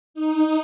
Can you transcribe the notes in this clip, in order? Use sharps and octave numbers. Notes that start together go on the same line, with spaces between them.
D#4